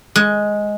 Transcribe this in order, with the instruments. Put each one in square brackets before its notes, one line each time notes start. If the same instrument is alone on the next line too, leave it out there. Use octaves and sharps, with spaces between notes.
[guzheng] G#3